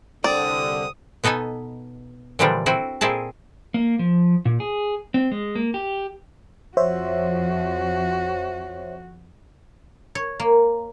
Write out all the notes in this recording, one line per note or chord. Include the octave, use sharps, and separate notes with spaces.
C2 D3 C4 D5 D#6
B2 B3 D#4 A4 G#5
A#2 D3 E3 F3 G3 D4
C4 E4 F#4
A#2 C4 E4 G#4 A5
A#3
F3
A#2
G#4
C4
G#3
A#3
G4
F2 F3 F#4 C5 C#5 E5
C#5
A#3